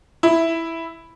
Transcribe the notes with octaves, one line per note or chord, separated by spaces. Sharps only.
E4